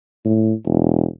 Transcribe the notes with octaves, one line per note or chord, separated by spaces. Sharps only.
A2
E1